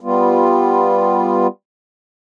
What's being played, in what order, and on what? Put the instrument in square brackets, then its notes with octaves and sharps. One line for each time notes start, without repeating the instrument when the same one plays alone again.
[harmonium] G3 B3 F4